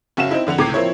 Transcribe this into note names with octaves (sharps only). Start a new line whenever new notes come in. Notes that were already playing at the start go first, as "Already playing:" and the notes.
F#1 C#4 F#4 E5 F5 E7
C4 D#4 E4
F2 D3 F#5 F7
C#2 A2 C3 D6 G#6 C7
F3 A#3 C4 E4 C#5